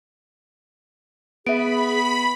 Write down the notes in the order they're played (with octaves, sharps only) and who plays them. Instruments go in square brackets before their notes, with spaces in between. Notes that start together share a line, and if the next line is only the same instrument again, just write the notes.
[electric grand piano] B3 [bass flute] G#4 [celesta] E5 D7 [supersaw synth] B5